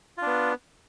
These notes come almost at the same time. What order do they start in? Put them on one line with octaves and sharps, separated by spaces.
F4 D4 B3